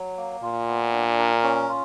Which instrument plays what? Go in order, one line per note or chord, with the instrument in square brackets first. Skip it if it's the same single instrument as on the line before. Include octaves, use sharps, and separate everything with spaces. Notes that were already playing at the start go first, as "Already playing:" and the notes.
Already playing: [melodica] F#3
A#3
[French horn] A#2 [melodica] F4
[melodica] B3
D4
A#4
C#4
F4